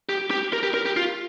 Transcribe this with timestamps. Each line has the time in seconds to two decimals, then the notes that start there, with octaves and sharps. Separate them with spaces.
0.09 G4
0.31 G4
0.53 A#4
0.63 G4
0.74 A#4
0.86 G4
0.96 F4